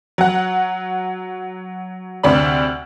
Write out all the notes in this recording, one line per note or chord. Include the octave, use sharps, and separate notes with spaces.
F#3 F#5
D2 C3 C4 D4 B5